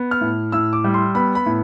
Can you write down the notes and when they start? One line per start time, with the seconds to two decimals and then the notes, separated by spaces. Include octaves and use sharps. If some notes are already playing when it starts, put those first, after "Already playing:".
Already playing: B3
0.11 F6
0.21 A2
0.52 A2 E6
0.73 D6
0.84 G3
0.94 C6
1.15 B3 B5
1.35 B5
1.46 A2